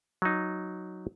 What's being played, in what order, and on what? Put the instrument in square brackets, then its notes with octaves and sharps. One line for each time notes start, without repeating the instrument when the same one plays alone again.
[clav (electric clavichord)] F#3 D#4